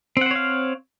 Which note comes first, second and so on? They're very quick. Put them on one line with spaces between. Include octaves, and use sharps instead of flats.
C4 F#5 C5 C#5 F5